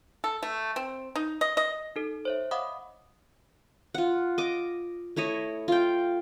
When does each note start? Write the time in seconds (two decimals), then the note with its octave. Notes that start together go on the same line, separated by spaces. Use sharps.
0.24 A4
0.43 A3
0.76 C4
1.16 D#4
1.41 D#5
1.57 D#5
1.96 D#4 A4
2.25 C5 C#5 E5
2.51 D#5 F5 F#5 B5 D6 D#6
3.94 F4 F#5
4.38 D#5 D6
5.16 A3 E4 C#5 D#5
5.68 F4 G5